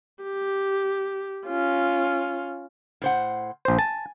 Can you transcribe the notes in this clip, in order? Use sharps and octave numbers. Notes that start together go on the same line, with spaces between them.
G4
C#4 F4
A2 C5 F#5
A#1 C5
G#5 A5